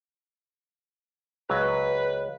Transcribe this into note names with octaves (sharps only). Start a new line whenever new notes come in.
C#2 F#3 B4 A#5